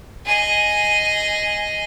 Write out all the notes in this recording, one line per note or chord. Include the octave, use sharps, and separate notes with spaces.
G#4 D#5